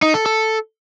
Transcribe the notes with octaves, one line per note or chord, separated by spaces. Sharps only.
D#4
A4
A4